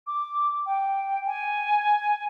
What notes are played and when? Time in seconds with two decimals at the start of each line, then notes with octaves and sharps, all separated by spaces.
0.07 D6
0.66 G5
1.26 G#5